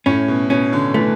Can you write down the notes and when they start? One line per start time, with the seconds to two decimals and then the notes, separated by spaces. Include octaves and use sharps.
0.06 A2 C#4
0.28 B2
0.50 B2 C#4
0.73 D3
0.94 E3 A3